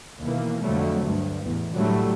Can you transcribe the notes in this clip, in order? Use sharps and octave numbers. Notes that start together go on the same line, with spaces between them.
D#2 B2 E3 A#3
F2 D3 F#3 G3 A3
D2 G2
A1 E2
A2 D3 F#3 G3 A3